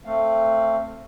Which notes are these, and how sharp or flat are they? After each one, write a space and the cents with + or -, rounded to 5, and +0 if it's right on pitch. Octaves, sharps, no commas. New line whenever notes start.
A3 +20 C4 +10 F5 +0